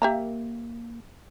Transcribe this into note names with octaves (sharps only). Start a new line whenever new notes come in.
A#3 G4 E5 A#5